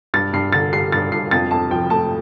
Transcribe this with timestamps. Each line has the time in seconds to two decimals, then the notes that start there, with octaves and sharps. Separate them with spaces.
0.14 G2 A6
0.33 G2 C7
0.53 D3 A6
0.73 G3 C7
0.92 G2 A6
1.12 G2 C7
1.31 F2 A6
1.51 F2 A5
1.71 F3 G5
1.90 A3 A5